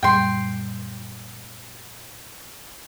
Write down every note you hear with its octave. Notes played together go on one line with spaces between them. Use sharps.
F#2 A#2 G3 G5 C6